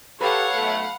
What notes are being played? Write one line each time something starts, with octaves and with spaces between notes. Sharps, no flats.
G4 A4 B4 C#5 F5 F#5
B1 A3